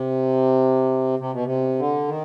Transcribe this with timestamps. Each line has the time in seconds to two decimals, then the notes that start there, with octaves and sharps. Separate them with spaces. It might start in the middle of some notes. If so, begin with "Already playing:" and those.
Already playing: C3
1.19 C3
1.32 B2
1.45 C3
1.79 D3
2.08 D#3